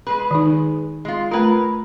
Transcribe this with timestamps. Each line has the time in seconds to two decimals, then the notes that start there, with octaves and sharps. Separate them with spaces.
0.07 G#3 G#4 B4
0.31 D#3 D#4
1.05 G#3 F4
1.31 A3 F4 A#4 B4